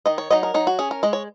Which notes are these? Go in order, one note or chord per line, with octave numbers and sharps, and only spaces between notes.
D#3 D#5
C#5
F#3 D#4 D#5
A#4
F#3 D#4
F#4
C#4 G#4
A#4
G#3 D#5
C#5